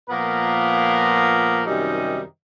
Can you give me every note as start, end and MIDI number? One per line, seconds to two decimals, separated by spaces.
0.10 1.62 46
0.10 1.62 53
0.10 1.62 58
0.10 1.62 59
0.10 1.62 70
1.66 2.20 42
1.66 2.20 48
1.66 2.20 51
1.66 2.20 55
1.66 2.20 63